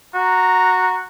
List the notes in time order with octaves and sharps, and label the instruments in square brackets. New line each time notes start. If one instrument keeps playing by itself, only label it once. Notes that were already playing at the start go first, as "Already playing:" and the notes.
[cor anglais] F#4 [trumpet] A#5